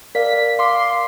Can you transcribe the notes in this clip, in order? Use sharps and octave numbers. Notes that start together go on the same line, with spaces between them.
A#4 D5 F5 B6
F5 C6 D6